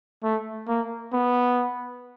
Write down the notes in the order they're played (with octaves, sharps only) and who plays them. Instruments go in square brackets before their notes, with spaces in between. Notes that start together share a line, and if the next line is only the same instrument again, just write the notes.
[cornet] A3
A#3
B3